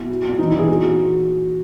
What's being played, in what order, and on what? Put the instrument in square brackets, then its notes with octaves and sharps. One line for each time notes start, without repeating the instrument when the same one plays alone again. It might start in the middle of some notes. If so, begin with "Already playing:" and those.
Already playing: [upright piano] B2 E4
F#3
A#2
E3 D#4
E4
E3
G#4
A#2 F#4